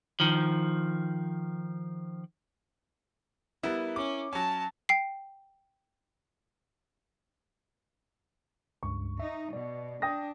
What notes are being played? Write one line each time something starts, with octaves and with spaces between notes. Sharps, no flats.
D#3 F3
G3 B3 E4 A#4
C#4 D6
F#3 C#4 A5
G5 C7
C#2 G2 C#6
D#4 E5
B2 D5
D4 G5 D#6 A#6